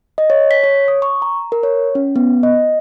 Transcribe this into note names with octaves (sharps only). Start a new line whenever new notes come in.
D#5
C#5
B6
C#5
D#6
C#6
A#5
A#4
C#5
C#4
B3
D#5